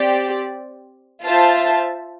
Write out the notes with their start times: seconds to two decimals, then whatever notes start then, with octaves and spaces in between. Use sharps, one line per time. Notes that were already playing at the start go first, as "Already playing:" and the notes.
Already playing: C4 G4 D5
1.23 F4 C5 E5 A5